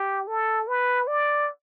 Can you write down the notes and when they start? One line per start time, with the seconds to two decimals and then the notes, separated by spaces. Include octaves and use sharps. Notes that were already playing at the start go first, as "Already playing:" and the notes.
Already playing: G4
0.27 A4
0.68 B4
1.08 D5